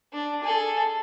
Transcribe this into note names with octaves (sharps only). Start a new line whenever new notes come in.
D4
G#4 A4